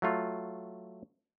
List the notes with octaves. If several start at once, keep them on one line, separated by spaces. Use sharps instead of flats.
F#3 A3 F4